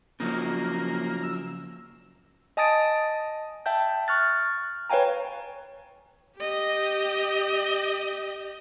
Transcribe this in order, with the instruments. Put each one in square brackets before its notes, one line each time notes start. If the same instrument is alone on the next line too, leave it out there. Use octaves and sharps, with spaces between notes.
[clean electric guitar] C#3 F3 F#3 [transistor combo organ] A#3
[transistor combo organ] E6
[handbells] D#5 G#5 A5 D#6 A6 D7
E5 G5 A5 G6
C#6 F6 F#6 A6
B4 C#5 F5 G5 G#5 A#5
[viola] G4 D#5